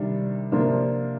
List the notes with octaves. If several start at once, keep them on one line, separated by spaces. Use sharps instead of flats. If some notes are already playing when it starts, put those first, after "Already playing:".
Already playing: C3 D#3 G3 D4
C3 F3 A#3 D4 F4